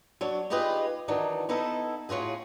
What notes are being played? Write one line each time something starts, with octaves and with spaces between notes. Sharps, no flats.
F#3 D4 C#5
D#4 F4 G4 G#4 B4 D#5
D#3 E3 F#3 D4 D#4
B3 D#4 E4 A4
A2 C#4 F4 F#4 G#4